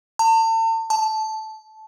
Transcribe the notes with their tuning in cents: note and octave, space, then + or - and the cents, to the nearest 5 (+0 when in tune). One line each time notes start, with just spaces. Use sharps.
A5 +40
A5 -15